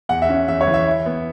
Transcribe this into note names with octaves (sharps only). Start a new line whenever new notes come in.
E2 F#5
E5
C#4
E2 E5
C#5
E3
E5
E4
B3